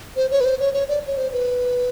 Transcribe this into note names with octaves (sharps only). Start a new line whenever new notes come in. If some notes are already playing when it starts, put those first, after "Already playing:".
C5
C#5
B4
C5
C#5
C#5
D5
C#5
C5
B4